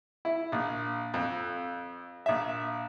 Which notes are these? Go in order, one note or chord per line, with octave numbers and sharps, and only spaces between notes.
E4
A#1
F2
A#1 E5